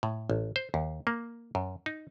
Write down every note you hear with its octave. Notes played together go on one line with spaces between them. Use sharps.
A2
A1
C5
D#2
A#3
F#2
D#4